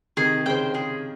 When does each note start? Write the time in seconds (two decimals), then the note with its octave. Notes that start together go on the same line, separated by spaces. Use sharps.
0.17 C3 D#3 G#4
0.46 C#3 C5 G5
0.74 G#4